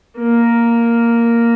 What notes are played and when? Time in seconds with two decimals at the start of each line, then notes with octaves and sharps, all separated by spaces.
0.19 A#3